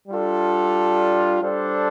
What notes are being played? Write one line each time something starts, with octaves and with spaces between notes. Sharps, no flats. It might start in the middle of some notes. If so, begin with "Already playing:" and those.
G3 D4 F4 A4
G3 D4 A4 C5